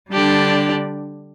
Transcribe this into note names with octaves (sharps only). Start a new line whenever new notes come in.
D3 G3 D4 G4 D5